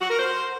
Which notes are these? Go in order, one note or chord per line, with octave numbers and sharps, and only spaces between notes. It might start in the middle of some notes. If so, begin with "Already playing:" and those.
F#4
A#4
C5